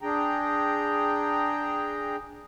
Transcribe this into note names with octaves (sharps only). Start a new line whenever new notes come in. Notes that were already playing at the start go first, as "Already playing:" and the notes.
D4 G#4 G5 A#5